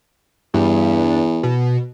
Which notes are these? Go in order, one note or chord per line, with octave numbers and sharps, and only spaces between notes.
E2 G2
B2